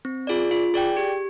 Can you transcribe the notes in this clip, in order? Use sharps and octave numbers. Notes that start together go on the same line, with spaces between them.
C4
F4 G#4 D5
F4
G#4 D5 G5
G4